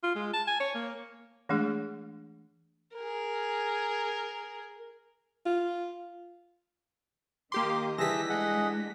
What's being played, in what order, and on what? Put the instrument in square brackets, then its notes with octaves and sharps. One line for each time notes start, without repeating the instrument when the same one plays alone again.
[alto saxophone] F4
G#3
A5
G#5
C#5
A#3
[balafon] E3 G#3 A3 D4 G#4
[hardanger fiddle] G#4 A#4
[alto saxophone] F4
[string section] D#3 D#5 [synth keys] A#3 G4 C6 [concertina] D6
[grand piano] E3 G3 G4 [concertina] G#4 E5 A5 [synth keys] A#6 B6
[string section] G#3 A3 D4 [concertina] G#4 D#5 F#5